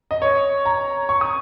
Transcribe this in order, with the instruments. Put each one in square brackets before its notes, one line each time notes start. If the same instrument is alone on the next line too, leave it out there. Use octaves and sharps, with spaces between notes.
[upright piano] D#5
C#5
A#5
C#6
D#6